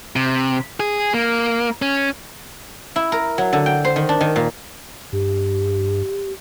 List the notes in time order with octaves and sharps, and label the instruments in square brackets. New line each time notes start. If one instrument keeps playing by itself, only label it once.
[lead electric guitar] C3
G#4
A#3
C#4
[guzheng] E4
A#4
F#3
D3
G5
C5
D#3
D4
D#3
A#2
[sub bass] G2 [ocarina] G4